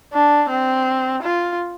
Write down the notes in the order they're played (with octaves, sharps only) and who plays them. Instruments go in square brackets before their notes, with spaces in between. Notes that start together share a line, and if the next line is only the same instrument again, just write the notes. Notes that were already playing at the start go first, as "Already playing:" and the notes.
[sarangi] D4
C4
F4